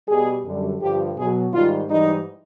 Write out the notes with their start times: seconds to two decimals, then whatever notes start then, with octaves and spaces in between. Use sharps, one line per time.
0.08 B2 G3 G#4
0.44 F#2 D3 G3
0.80 G2 D3 F3 G4
1.16 B2 F#3 G#4
1.53 G#2 D#3 G3 F4
1.89 G#2 E3 G3 D#4